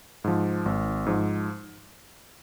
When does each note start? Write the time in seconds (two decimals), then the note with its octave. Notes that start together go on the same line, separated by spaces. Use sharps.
0.24 G#2 F3
0.66 G#1
1.07 G#2 F3